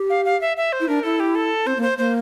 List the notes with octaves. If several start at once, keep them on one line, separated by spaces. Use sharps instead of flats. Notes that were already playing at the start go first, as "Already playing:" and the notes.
Already playing: G4
F5
F5
E5
E5
C5
E4
D4 A#4
E4 A4
G4
A4
C4 C5
A#3
C5
A#3 C5